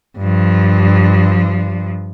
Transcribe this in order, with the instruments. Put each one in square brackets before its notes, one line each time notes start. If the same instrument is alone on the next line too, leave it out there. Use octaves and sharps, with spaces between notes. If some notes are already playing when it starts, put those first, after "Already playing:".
[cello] G2 F3